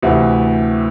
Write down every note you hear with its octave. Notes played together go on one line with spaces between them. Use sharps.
D2 C3 E3 A3 E4